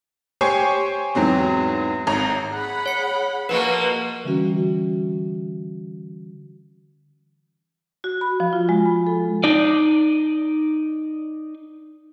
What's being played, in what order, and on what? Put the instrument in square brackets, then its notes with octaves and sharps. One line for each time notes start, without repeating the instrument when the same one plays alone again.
[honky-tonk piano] G4 C5 C#5 G#5 C#6 C7
E2 G#2 F#3 C4
G#1 C#5 A#5
[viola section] G#4 F#5 B5
[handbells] C#5 C#7
[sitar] B2 F3 B3 [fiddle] A#3 F#4 [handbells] B4
[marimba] D3 E3 G3 C#4 F#4
F#4
B5
F3
F4
G#3
B5
A4
[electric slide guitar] D#4 D5